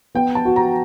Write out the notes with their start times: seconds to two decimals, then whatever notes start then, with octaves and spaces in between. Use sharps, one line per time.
0.15 B3 G5
0.35 A5
0.45 F#4
0.56 A#5